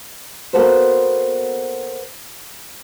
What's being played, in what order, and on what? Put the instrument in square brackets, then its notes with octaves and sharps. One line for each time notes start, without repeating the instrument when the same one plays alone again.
[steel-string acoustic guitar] A#3 B3 F#4 A4 B4 C5